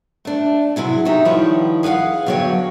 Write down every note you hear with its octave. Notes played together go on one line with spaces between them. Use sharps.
A3 D4
C3 F#3 E4 G#4
D#4 F#4 G4 E5
D#3 F3 G3 E4 B4 C#5
G#4 B4 D#5 F5 F#5
F#2 D3 F#3 B3 C#5 G5